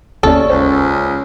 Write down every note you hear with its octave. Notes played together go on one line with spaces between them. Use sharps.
G1 D#2 C#4 A4 D5
C#2 C5